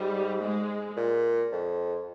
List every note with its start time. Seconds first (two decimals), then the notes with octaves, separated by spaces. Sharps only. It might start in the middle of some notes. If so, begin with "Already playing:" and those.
Already playing: G#2 G3
0.42 G#3
0.97 A#2
1.52 F2